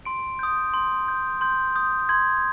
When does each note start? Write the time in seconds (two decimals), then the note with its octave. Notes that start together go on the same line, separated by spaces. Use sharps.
0.05 C6 D7
0.39 D#6 G6
0.74 C6
1.07 D#6 G6
1.41 C6 G6
1.76 D#6 G6
2.09 C6 G#6